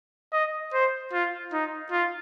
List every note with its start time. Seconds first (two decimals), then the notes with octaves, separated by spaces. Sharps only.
0.32 D#5
0.73 C5
1.13 F4
1.53 D#4
1.91 F4